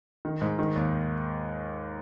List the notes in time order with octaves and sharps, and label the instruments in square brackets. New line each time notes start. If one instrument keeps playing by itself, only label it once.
[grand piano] D#3
G#2
D#3
D#2